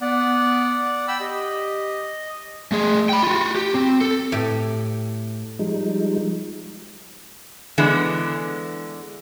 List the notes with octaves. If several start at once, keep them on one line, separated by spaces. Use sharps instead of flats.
B3 D5 F#5
G5 B5 E6
G4 D#5
A3 G#4
G5 B5
F4 F#4
G4
C4
A4
A2 G4 G5
F3 G3 G#3 D#4
D3 E3 G#3 B3